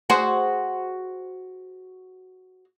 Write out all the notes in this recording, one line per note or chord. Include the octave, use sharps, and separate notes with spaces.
F#4 G#4 C5